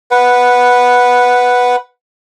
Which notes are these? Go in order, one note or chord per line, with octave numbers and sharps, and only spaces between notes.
B4 F#5